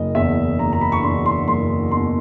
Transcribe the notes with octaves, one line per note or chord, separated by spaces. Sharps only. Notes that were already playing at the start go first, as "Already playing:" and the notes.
Already playing: F#1 D#5
E2 B2 E5
F#1 A#5
A#5
B5
C#6
E2 B2 C6
C6
F#1 C6
E2 B2 C6